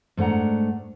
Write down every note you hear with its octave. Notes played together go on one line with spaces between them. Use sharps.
G#2 A3 D4 F#5 A#5